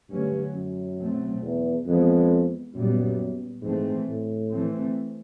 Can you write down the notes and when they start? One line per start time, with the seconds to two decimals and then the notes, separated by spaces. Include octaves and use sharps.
0.09 G2 D3 F#3 A3 C#4
0.54 F#2
0.98 B2 F#3 A3 C4
1.42 E2
1.86 F2 E3 G#3 B3
2.74 F#2 A#2 G3 B3
3.62 G#2 E3 A3 C4
4.06 A2
4.50 E3 A3 C4